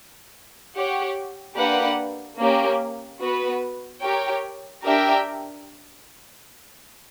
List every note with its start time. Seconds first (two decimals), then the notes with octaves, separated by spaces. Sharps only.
0.75 G4 C#5 F#5
1.57 A#3 D4 G4 B4 F#5
2.38 A#3 C#4 G4
3.20 B3 F#4 B4
4.01 G4 A#4 C#5 G5
4.83 D4 G4 A#4 E5 G5